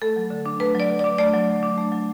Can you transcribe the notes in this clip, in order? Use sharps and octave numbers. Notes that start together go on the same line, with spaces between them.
A3 A4
F#3
D3
D4
A3 B4
F#3 D5
D3
D4 D5
A3 D5
F#3
D3
D4
A3
F#3